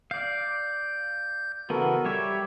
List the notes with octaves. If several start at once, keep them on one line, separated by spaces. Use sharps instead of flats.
D5 F5 G6
C#3 E3 B3 F#4 A4 A#4
G3 G4 C#5 E5 G5